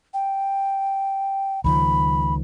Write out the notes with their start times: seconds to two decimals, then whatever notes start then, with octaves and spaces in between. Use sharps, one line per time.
0.14 G5
1.64 C#2 D#3 F3 B5